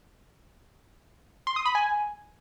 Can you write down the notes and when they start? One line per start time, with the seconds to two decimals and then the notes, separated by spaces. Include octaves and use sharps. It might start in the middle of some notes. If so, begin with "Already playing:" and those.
1.47 C6
1.56 D#6
1.66 B5
1.75 G#5